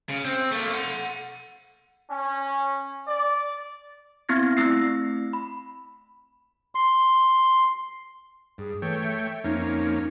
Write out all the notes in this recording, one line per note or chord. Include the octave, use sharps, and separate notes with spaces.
C#3
C4
A3 A#3
F#5 C6
C#4
D5
B3 C4 E4 G#6 A#6
A3 C4 E4 E6 A#6 C7
B5
C6
G2 G#4
E3 A3 C#5 G5
E5
F2 A#3 C#4 D#4